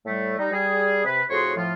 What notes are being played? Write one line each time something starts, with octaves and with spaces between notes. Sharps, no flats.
A2 G3 A3
G3 D#4
G3 G#4
C3 B4
F2 A2 F#4 G#4 C#5 C6
A2 F3 F4